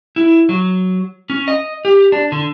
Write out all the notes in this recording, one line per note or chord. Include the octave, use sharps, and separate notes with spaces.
E4
F#3
C#4
D#5
G4
D4
D3